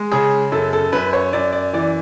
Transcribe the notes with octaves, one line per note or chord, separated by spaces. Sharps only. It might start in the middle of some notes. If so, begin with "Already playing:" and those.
Already playing: G#3
C#3 G#4
F#2 A4
A4
F#2 B4
C#5
F#2 D5
D5
E3 D5